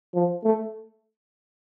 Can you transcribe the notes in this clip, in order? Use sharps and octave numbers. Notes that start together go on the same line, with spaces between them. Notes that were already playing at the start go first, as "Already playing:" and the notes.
F3
A3